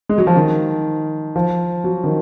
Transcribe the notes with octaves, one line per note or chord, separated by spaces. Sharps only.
G#3
F#3
F3
D#3
F3
F#3
D#3